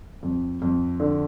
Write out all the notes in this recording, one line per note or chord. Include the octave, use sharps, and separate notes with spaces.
F2
F2
D3